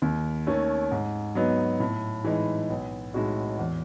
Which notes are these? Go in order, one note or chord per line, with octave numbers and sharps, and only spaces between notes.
D#2
D#3 A3 C#4
G#2
F#3 B3 D#4
A2
E3 G#3 D#4
B1
A2 G#3 D#4 F#4
E2